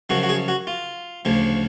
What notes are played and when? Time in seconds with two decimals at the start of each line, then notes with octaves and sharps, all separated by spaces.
0.10 F#2 C#3 F3 F#4
0.23 F#4
0.29 G#4
0.48 F#4
0.67 F4
1.25 D2 C#3 F3